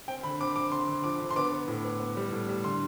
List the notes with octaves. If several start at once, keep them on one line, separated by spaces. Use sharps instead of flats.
C4 G5
D3 B5
C4 D6
D3 D6
D3 C6
D3
F3 D6
D3
C6
B3 D6
B3
A2
B3
B3
G3
A2
G3
D3 C6